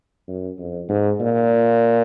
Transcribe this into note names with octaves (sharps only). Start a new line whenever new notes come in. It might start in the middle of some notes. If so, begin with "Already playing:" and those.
F#2
F2
G#2
A#2